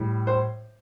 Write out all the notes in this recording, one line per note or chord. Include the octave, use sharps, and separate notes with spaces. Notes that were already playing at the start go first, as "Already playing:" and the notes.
Already playing: A2 G3
C5